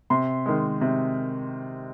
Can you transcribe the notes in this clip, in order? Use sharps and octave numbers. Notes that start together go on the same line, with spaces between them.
C3 C6
D#3 G#3
C3